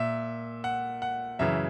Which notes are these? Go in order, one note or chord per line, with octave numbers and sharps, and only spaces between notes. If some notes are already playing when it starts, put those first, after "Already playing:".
Already playing: A#2 E5
F#5
F#5
F#2 C#3 E3 E5